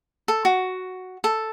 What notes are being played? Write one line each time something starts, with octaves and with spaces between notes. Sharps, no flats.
A4
F#4
A4